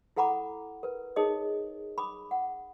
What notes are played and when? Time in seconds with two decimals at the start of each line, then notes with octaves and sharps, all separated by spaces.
0.16 E4 A4 F#5 A#5 B5 D6
0.83 A#4 B4
1.16 D#4 G#4 A#4 C#5 D#5 D#6
1.98 B5 D6 D#6
2.31 F#5